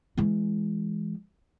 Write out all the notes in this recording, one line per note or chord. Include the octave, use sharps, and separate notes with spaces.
E3 G#3